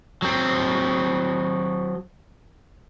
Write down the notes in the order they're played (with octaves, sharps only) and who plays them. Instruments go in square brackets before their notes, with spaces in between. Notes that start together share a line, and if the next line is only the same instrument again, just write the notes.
[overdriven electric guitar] F#3 C4